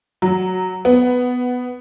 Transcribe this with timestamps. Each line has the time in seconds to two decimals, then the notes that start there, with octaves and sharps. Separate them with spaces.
0.22 F#3
0.85 B3